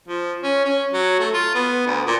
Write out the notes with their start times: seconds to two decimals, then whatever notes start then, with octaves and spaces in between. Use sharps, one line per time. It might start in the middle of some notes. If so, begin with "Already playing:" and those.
0.08 F3
0.43 C#4
0.65 C#4
0.93 F#3
1.20 A3
1.34 F4
1.55 B3
1.86 D2
2.06 A#2